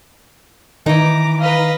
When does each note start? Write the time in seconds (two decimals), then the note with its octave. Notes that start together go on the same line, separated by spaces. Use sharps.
0.86 D#3 E3 D#4 A#5 D6
1.41 B4 D#5 F5 A#5